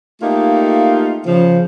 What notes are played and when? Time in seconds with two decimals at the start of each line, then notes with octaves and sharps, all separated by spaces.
0.22 A3 A#3 D#4 F4 G4
1.26 C#3 F3